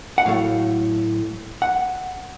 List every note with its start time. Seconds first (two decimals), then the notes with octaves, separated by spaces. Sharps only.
0.18 F#5
0.26 A2 F#3 A3 F5
1.62 F#5